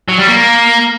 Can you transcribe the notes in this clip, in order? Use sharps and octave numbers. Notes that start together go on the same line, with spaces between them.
F#3
G3
A#3